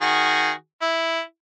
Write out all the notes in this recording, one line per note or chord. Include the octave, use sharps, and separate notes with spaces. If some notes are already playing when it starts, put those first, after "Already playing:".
D#3 F#4 G#4
E4